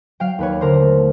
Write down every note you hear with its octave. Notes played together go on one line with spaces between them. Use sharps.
F#3 F5 G5
D#2 B4 C#5
D3 A#4 C5
A3